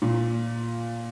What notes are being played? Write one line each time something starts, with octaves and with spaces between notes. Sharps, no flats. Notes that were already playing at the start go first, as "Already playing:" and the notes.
A#2